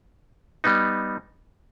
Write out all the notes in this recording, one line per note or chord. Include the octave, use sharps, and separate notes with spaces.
G3 B3 D#4